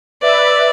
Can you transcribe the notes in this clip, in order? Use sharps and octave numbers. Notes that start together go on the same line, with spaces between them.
B4 D5 E5